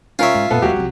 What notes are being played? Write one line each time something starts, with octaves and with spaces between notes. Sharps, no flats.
C#4 F4 A#4 C#5 E5
G#2
F#2 A#2 B3 A4
D#2 F#3 G#3 F#4 G4
C2 F3